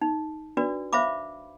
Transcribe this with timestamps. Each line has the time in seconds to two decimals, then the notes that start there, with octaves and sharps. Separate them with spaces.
0.01 D#4
0.57 D4 F#4 B4 D5
0.93 C5 E5 F5 B5 D6